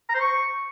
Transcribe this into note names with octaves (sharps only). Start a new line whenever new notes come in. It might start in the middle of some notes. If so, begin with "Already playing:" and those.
A#5
C5
C#6